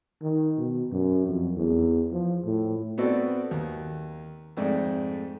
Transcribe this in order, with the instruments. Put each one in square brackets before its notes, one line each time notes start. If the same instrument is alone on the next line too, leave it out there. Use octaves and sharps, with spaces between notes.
[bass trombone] D#3
B2
F#2
F2
E2
F3
A2
[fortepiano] B3 C4 F#4 A4 D5
D#2
F2 G#2 A3 D5